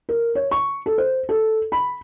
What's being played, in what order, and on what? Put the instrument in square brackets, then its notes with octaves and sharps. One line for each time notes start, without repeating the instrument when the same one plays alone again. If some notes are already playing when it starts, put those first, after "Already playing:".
[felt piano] A#4
C#5
C#6
A4
C5
A4
B5